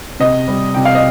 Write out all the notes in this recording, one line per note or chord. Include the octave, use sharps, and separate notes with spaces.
C3 D#5
G3
C3 G5
F5
D#5